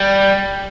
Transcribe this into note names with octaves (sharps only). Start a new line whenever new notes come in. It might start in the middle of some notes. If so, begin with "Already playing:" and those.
Already playing: G3